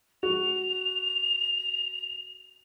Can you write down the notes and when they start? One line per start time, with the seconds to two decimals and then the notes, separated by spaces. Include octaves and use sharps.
0.23 F#4 F7